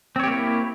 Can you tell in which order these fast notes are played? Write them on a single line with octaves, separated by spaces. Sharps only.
C4 C#5 G4 A#3 E4